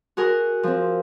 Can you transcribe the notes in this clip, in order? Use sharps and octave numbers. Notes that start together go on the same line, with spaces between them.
F#4 G#4 A#4
F3 C4